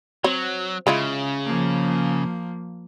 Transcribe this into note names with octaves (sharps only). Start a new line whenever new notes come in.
F#3 C4 C#5
C#3 G#3 E4 F4
F3 A#3